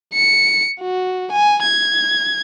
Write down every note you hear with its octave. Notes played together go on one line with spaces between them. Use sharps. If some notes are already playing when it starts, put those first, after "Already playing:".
C#7
F#4
G#5
G#6